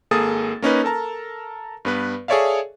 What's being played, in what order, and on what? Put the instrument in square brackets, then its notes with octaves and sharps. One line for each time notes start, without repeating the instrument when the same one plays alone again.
[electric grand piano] G#1 A#3 G#4 A4 D#6 A6
A#3 C#4 D#4 B4
A4 A#4 A5 A#5
G2 B3 B4
G#4 A4 C#5 D5 E5 F5